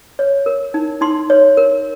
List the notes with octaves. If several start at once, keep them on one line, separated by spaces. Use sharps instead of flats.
C#5
A#4
D#4
D#4 C6
C#5
A#4